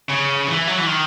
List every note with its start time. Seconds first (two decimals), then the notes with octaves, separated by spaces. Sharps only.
0.09 C#3
0.47 E3
0.68 F#3
0.78 E3
0.87 D#3